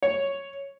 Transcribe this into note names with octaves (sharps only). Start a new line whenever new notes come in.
C#5